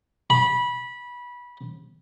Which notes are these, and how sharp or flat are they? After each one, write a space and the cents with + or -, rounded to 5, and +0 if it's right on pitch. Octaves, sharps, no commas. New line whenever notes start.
B5 -20